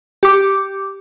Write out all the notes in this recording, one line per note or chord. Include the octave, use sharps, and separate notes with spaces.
G4 D6